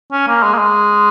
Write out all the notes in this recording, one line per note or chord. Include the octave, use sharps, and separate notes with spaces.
C#4
A#3
G#3
A#3
G#3